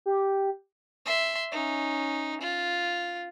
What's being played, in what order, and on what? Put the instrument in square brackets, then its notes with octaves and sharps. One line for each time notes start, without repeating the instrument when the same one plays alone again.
[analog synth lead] G4
[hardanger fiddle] E5 C6
C#4 D#4
F4